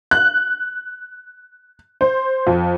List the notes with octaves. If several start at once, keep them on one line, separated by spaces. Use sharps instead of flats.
F#6
C5
F2